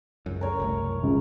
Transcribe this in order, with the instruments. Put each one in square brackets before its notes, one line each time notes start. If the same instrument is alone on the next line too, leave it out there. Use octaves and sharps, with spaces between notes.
[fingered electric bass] C#2 F#2
[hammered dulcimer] A#4 C#5 A#5
[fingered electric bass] F#1 C2 A3
[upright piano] C#2